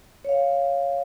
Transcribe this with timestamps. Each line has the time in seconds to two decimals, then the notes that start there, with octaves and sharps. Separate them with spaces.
0.25 C#5 F5